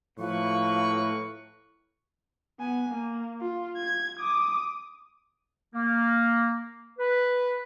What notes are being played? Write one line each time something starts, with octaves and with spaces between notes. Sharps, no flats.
A2 F3 A#3 B4 C#6
B3 G#5
A#3
F4
G#6
D6 D#6
A#3
B4